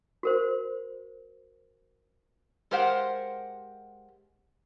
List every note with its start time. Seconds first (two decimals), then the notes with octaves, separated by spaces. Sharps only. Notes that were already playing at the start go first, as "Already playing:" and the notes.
0.23 F#4 A#4 C5
2.71 G#3 G4 A#4 C5 F5 F#5